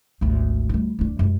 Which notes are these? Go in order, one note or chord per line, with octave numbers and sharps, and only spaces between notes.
G#1 D2
D2 G3
D2 D4
F#2 G#3